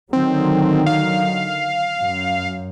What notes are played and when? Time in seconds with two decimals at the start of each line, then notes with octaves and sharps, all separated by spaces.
0.13 D3 D#3 F#3 C4
0.86 F5
1.99 F#2